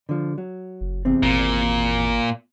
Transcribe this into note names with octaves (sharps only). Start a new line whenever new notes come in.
D3 F3
F#3
F#1
E2 C3 C4
G#1 A#2